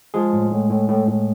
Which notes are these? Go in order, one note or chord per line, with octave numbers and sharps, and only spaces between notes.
F3 G#3 G#4
A2
A2
A2
A2
A2